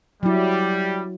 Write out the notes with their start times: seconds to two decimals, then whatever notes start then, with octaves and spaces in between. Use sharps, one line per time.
0.23 F#3 G3 E4